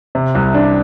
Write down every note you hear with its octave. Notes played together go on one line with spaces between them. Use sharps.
C3
C2
D4